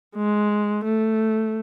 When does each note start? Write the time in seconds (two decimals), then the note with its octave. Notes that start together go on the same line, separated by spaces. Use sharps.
0.16 G#3
0.85 A3